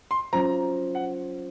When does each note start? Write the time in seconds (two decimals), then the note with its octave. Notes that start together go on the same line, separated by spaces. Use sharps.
0.11 C6
0.33 F#3 C#4 F4 C5 A#5
0.95 F#5